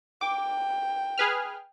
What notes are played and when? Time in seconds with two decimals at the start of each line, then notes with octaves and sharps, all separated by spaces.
0.21 G5 D6
1.18 G#4 B4 F6